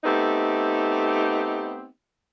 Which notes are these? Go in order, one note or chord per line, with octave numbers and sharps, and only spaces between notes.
A3 B3 C4 D#4 G4